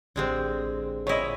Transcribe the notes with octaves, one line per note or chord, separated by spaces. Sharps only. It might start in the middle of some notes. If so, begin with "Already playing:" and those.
A1 D3 G#3 C4 G4 C5
A#2 E4 C#5 D#5